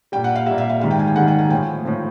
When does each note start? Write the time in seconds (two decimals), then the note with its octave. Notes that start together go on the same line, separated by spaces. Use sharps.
0.12 A#2 G3 G5
0.24 F#5
0.36 F5
0.46 A#2 G3 E5
0.58 E5
0.69 F5
0.81 G#2 D#3 G3 F5
0.91 G5
0.99 G#5
1.07 G5
1.16 G#2 D#3 G3 F#5
1.28 G5
1.39 G#5
1.50 A2 F3 G5
1.85 A2 F3